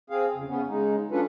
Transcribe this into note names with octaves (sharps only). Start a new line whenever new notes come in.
C4 G#4 F5
F2 C#3
C#3 B3 C#4
C#3 G#3 D#4
F#3 C#4 D4 F4 A4 B4